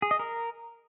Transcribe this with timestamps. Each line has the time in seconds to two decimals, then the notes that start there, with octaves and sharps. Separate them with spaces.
0.02 G#4
0.11 D#5
0.19 A#4